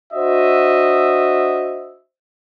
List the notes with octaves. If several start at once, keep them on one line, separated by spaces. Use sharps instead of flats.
D4 F#4 C5 D#5 E5